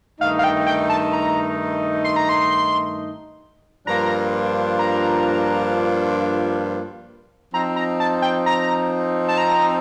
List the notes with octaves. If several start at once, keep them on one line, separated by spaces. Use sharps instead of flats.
G2 D#3 A3 D#4 F5
F5
G5
G5
A5
A#5
C6
A#5
C6
G2 F3 A#3 D4 F4 A#5
A#5
F3 C4 D#4 A#5
A#5
A5
G5
A#5
A5
A#5